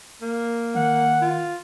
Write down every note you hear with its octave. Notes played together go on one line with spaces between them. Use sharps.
A#3
D#3 F#5
F4